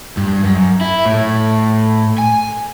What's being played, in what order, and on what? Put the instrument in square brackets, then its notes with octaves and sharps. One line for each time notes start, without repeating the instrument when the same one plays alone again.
[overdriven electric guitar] G2
F#2
E4
A2
G#5